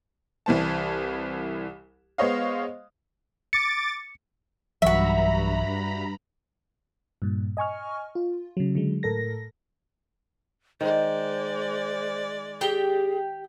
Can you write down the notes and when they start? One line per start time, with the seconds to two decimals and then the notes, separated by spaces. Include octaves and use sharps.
0.46 C2 E3 G3 C5 A5
2.18 G#3 B3 C5 C#5 D#5 F5
3.53 D6 A6 C#7
4.82 B1 G2 E3 F#3 F#4 E5 A#5 B5
7.22 G2 A#2
7.57 D#5 G#5 C#6 F6
8.15 F4
8.57 C#3 F#3
8.75 D3 F#3 G#3
9.03 A2 A4 A#4 A#6
10.81 D#3 G#3 C5 D5
12.61 G4 G#4 G5